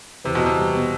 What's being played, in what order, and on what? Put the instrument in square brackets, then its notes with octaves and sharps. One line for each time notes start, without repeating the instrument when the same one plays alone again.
[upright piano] E2 [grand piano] C3
[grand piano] B2
[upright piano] E2 [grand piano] C3
[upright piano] G3
B2